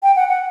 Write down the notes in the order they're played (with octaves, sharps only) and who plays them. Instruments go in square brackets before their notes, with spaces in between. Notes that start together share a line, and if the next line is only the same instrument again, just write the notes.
[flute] G5
F#5
F#5